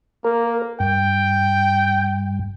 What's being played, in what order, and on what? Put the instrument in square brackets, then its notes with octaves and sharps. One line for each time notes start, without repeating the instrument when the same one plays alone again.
[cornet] A#3 [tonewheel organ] A#4
[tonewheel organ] G2 [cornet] G5